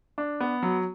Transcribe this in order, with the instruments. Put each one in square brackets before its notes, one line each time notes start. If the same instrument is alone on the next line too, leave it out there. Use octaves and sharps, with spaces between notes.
[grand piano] D4
B3
F#3